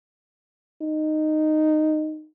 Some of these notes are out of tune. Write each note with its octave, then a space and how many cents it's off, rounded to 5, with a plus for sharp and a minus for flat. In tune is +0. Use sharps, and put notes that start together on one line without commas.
D#4 -10